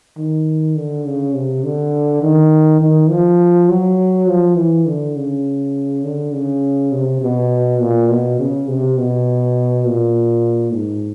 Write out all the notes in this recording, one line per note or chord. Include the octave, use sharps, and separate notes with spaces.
D#3
D3
C#3
C3
D3
D#3
D#3
F3
F#3
F3
E3
D3
C#3
D3
C#3
C3
B2
A#2
B2
C#3
C3
B2
A#2
G#2